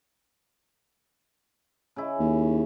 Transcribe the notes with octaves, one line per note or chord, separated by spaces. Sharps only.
C#3 E4
D#2